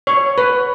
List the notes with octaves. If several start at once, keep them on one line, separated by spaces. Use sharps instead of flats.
C#5
B4